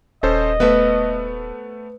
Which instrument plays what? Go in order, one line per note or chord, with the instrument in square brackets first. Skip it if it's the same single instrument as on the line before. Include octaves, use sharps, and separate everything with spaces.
[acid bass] D#1 [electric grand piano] C#4 A4 C5 [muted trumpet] D#5
[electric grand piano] A3 B3 [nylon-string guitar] B4 C5 E5